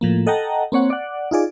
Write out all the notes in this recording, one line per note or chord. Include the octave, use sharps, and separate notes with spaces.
A2 F3 A#3
A4 D#5 F#5 G5 A5 A#5
A#3 C4 C#5 F#5
D5 F#5
D#4 F4 G#4 D5